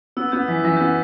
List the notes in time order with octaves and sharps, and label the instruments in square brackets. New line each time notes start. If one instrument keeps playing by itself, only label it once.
[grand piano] B3 [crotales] E6
[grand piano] B3 [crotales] G6
[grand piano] E3 [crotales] B6
[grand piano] E3 [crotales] A#6
[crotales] G6
[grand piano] B3